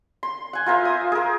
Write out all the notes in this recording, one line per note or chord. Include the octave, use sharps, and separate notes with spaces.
C6
F#5 G#5
F4 A#4 C5 E5
D#6
G#4 A#4